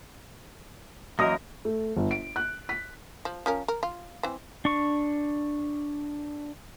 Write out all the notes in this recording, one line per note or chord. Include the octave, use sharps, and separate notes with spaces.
F#2 E3 A#3 A#4 D#5 D#6 A#6
A3
G1
D7
F#6
B6
F3
F3 C#4 A#4
A#4
F4
E3 C4
D4 C#6